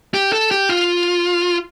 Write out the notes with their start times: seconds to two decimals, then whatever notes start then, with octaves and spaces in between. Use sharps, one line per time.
0.14 G4
0.33 A4
0.51 G4
0.69 F4